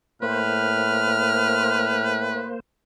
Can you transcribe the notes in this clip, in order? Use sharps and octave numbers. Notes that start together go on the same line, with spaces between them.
A2 A#3 B4 C5 F6